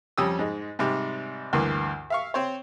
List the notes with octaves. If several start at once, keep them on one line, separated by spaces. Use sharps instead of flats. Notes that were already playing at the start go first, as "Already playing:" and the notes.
F2 G3 C#4 D#6 E6
G#2 G#3
G#2 C3 G3
D2 G2 E3 A#3
E5 F5 C#6
C4 C5 C#5